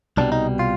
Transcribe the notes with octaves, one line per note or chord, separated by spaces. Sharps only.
C2 B2 G3 D4
D#4
F4